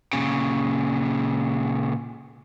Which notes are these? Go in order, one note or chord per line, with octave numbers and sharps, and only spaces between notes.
A#2 C#3